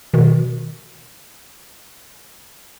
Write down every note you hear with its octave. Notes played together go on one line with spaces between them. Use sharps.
B2 D#3